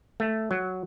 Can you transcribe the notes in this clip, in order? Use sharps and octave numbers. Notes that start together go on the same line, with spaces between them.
A3
F#3